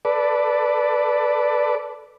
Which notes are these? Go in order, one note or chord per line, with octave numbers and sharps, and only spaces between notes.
A4 B4 D5